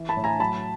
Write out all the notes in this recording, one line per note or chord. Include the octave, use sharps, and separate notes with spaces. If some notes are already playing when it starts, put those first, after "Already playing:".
Already playing: E3
A5 B5
A2
G#5 A#5
F#3 A5 B5